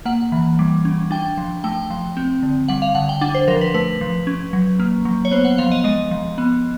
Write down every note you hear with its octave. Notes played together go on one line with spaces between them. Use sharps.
A#3 F#5
E3
G3
C#4
D4 G5
F3
A3 G5
F3
C4
D3
G3 F#5
F5
D3 F#5
G5
D4 F#5
C5
F3 A#4
B4
A3 B4
F3
C#4
F#3
A#3
F#3
C#5
B3 C5
F#5
F3 F5
D#5
G#3 D#5
F3
B3